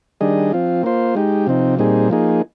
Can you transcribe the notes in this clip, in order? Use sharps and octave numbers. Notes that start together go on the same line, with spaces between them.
D#3 G3 D4 G#4 D#5
F3 C4 F4
A#3 F4 C5
G#3 D#4 G4
C3 F3 C4 D#4
A#2 G3 C4 D#4 G#4
F3 A#3 D#4 G#4